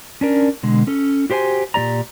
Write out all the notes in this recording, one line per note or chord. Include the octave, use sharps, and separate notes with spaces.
C#4 D4 A#4
B2 D3 G#3
C#4 A4
F#4 G4 C5 F#5 G#5
A#2 G#3 G4 D5 A#5